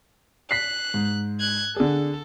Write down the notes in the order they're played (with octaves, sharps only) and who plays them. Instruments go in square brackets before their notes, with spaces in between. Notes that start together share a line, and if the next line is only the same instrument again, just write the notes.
[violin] F#6 [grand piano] B6 C7
[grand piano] G#2
[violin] F#6 G#6
[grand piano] D3 G#4 [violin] A4